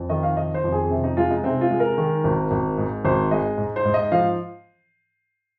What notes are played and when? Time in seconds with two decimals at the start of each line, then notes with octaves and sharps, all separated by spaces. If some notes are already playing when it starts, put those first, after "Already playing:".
Already playing: F2
0.09 D#3 D#5
0.23 F5
0.37 D#3 D#5
0.54 C5
0.64 F2
0.72 G#4
0.90 C3
1.04 D#4
1.17 G#3 F4
1.30 D#4
1.44 C3 C4
1.61 F4
1.70 G#3
1.80 A#4
1.98 D#3
2.24 G#1
2.51 G#1
2.78 G#2
3.05 G#1 C5
3.31 G#3 D#5
3.58 G#2
3.76 C5
3.85 G#2
3.94 D#5
4.12 F3 F5